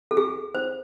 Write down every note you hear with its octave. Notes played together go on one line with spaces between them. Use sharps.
A4
G#4
C5